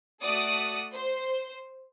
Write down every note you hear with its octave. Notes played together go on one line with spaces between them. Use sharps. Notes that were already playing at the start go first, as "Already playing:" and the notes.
A3 F#4 D5 D#6
C5